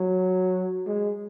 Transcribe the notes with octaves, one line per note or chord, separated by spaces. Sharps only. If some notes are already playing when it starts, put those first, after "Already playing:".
Already playing: F#3
G#3